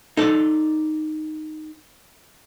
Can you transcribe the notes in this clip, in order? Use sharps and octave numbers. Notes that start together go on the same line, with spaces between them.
D#4 A4 D5